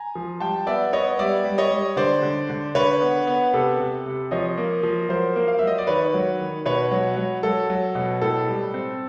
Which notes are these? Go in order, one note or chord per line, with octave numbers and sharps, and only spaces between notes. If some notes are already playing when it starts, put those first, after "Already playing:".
Already playing: G#5 A#5
F3
G3 G5 A5
B3 D5 E5
B3 C#5 D#5
G3 D5 E5
G3
C#5 D#5
G3
D3 C5 D5
D3
D3
D3 B4 C#5
B3
B3
C3 A4 B4
C3
C3
F3 C#5 D#5
A#3
F3
F#3 A#4 C5
A#3
F5
F#3 E5
D#5
D5
D#3 B4 C#5
F#3
D#3
B2 B4 C#5
F#3
F#3
F#3 A4
F#3
B2
A2 A4
G3
C4